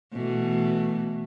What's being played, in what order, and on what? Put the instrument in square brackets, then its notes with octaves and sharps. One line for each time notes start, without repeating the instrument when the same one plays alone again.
[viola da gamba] B2 E3 A3